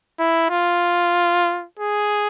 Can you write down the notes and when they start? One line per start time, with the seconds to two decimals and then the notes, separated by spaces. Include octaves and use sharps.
0.19 E4
0.50 F4
1.79 G#4